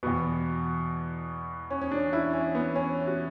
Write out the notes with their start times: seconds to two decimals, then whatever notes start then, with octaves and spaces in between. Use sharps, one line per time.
0.03 E2 B2 B3
1.70 C#4
1.81 C#4
1.91 D4
2.13 E4
2.33 C#4
2.55 B3
2.76 C#4
3.07 F#4